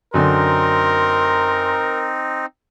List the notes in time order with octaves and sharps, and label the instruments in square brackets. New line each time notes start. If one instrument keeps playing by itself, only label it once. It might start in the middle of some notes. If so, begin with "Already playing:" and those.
[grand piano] F#2 D3 [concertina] C4 D#4 [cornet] A#4 [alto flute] C6